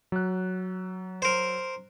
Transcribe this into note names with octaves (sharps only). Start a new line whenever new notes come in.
F#3 F#6
A#4 C5